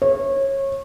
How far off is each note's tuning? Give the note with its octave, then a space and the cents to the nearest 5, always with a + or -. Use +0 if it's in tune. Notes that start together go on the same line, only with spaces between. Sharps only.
C#5 -25